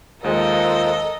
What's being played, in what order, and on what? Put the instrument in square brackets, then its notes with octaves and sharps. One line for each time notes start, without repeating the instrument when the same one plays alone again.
[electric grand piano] D#2 G#3 [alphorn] F3 [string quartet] A4 D#5 [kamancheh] A#4